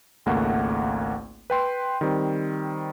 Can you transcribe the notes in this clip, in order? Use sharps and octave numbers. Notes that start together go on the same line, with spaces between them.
G#1 C#2 A3 A#3 F#5
B4 G5 C6
D#3 G3 C4